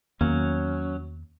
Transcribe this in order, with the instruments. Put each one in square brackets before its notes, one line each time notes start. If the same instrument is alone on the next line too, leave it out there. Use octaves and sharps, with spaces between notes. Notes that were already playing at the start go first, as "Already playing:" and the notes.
[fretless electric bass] E2 D#3 A#3 [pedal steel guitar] F#3 C#4